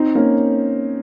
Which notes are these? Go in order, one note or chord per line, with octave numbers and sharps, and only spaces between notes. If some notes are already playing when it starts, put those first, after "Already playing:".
Already playing: C4 D#4
A#3 C#4